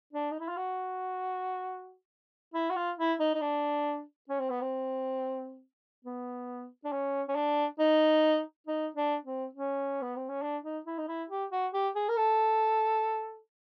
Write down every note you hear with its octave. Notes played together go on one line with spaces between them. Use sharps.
D4
D#4
E4
F4
F#4
E4
F#4
F4
E4
D#4
D#4
D4
C#4
C4
B3
C4
B3
D4
C#4
C#4
D4
D#4
D#4
D4
C4
C#4
B3
C4
C#4
D4
D#4
E4
D#4
E4
G4
F#4
G4
G#4
A#4
A4